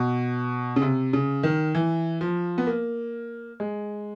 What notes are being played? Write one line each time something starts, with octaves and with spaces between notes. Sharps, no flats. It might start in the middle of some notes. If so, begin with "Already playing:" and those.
Already playing: B2
C#3
C3
C#3
D#3
E3
F3
B3
A#3
G#3